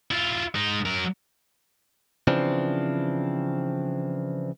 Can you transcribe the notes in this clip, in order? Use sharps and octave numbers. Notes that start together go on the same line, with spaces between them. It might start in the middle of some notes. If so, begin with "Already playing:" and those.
E4 F4
G#3 D#4
F#3 A#4
C#3 E3 F3 C4 D4